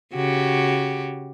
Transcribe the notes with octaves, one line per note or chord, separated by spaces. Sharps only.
C#3 F#4 G4